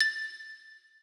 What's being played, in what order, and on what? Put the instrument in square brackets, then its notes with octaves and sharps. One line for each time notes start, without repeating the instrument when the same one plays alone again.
[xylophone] A6